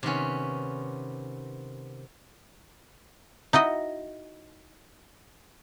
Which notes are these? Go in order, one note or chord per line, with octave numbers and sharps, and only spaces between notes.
C3 D#3 B3 C#4
D#4 E4 F#4 D#5